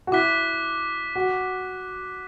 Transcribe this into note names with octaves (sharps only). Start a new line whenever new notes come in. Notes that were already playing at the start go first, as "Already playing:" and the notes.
F#4
E4 D6 F#6 B6
F#4